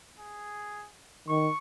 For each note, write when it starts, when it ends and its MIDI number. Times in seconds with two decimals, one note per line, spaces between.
0.19 0.87 68
1.28 1.48 51
1.28 1.58 85